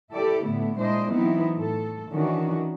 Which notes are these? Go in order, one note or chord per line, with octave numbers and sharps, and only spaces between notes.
E4 G4 A4 D5
A2 D3 A3 B3 E4
A#2 G#3 D4 E4 C5 D#5
E3 F#3 B3 C4 D#4 E4
A2 A4
D#3 E3 C#4 D4 F#4